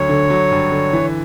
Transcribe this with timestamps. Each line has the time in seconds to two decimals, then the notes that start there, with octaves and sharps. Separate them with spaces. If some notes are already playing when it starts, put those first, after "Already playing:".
Already playing: D2 F#3 C#5
0.09 D3
0.30 F#3
0.52 G2
0.72 D3
0.93 E3